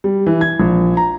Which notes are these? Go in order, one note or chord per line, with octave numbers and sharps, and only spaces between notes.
G3
E3
G#6
A#1
A#5